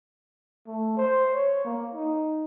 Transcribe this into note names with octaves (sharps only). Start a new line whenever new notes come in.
A3
C5
C#5
A#3
D#4